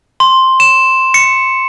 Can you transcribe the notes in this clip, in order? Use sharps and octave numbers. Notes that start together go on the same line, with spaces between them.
C6
E7
C#7